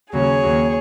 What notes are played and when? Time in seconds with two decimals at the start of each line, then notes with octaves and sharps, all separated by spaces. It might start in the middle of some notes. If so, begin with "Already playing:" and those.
0.13 D#2 C#3 F#3 G#4 C#5
0.42 D#2 D#3 F#3